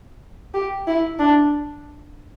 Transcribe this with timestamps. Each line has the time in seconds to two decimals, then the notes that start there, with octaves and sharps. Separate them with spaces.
0.54 G4
0.88 E4
1.20 D4